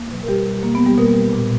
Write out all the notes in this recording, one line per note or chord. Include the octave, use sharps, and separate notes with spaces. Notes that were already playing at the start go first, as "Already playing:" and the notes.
Already playing: A#3
B2 F#3
A#4
B2 G3 G4
G3
B2 A#3
B3
F#3
G3 G4
B2 A#3 A#4
G3
A#2